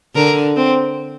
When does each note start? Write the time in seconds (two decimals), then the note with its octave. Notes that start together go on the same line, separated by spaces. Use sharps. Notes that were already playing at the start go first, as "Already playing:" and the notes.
0.16 D3 A#4
0.56 C4